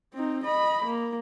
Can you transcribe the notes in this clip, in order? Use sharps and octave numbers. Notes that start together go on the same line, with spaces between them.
C4 D#4
D#5 B5
A#3